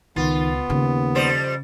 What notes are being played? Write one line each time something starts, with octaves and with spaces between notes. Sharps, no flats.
C#2 D#3 B3 F4
D#2 C#3
F2 G3 C5